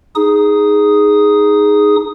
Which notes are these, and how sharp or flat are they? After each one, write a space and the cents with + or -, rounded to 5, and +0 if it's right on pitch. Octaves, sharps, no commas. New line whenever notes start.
D#4 +0 G#4 +0 D#6 +0